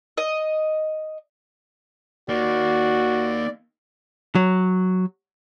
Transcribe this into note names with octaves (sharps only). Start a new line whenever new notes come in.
D#5
A#3 D#4 F#4 D5
F#3